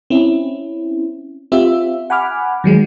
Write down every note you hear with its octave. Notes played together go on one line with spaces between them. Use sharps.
C4 C#4 E4
C4 F4 G4 E5
F#5 G#5 B5 D6 F6
D#3 F#3 G#3